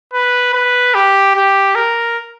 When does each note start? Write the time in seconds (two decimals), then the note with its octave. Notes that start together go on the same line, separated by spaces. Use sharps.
0.14 B4
0.53 B4
0.95 G4
1.36 G4
1.75 A#4